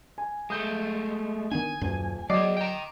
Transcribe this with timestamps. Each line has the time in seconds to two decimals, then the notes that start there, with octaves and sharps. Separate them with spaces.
0.18 G#5
0.50 G#3 A3 D#6 G6
1.51 D#3 B3 D4 G#5
1.81 D#1 F#2
2.30 F#3 G#4 D5 D#5 D6 C7
2.57 G5 A#5